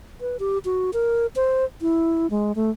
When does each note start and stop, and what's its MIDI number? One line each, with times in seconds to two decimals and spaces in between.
0.21 0.37 71
0.40 0.58 67
0.65 0.91 66
0.93 1.27 70
1.36 1.65 72
1.81 2.27 64
2.30 2.52 56
2.55 2.70 57